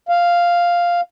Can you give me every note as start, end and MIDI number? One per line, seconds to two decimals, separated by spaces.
0.09 1.01 77